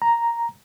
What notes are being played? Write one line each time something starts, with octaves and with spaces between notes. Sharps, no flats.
A#5